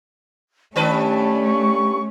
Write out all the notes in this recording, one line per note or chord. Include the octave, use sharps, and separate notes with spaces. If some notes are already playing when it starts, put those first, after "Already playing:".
G2 D#3 A3 C#4 B4 A5
C#6